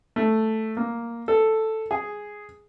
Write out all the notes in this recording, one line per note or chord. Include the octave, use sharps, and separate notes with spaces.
A3
A#3
A4
G#4